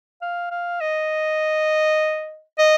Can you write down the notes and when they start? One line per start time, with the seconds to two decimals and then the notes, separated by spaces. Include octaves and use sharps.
0.22 F5
0.51 F5
0.81 D#5
2.58 D#5